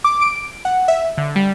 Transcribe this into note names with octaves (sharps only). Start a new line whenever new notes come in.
D6
D7
F#5
E5
D3
G3